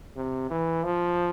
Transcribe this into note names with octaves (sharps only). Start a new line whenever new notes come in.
C3
E3
F3